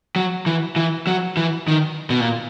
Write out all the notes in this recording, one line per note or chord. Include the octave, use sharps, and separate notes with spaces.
F#3
E3
E3
F#3
E3
D#3
B2
A#2